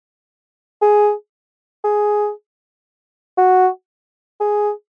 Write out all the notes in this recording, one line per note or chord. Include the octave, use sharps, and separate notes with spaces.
G#4
G#4
F#4
G#4